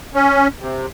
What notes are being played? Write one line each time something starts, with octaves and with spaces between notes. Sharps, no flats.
C#4
C3